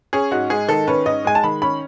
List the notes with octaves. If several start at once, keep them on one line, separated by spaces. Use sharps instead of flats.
C#4 G#4
G#2 F#4
G#3 G#4
D#3 A4
C#4 B4
G#2 D#5
G#3 G#5
A5
D#3 B5
C#4 B5